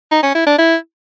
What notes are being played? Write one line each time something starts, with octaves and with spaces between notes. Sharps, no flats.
D#4
C#4
E4
D4
E4